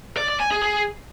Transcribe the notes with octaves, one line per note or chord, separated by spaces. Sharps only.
D5
D5
G#5
G#4
G#4